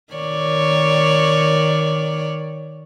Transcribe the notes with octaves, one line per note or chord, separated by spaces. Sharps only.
D#3 C#5 D5